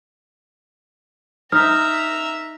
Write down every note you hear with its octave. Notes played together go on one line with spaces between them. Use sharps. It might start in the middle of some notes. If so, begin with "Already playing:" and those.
D#4 E5 A#5 F6